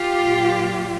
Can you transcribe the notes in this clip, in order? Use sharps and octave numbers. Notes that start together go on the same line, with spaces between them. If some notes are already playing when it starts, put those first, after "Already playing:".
Already playing: F4 G4
A#2 F#3